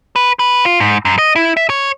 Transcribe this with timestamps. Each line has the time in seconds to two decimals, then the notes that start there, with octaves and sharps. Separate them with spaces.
0.16 B4
0.39 B4
0.65 F4
0.80 G#2
1.05 F#2
1.18 D#5
1.36 E4
1.57 E5
1.70 C#5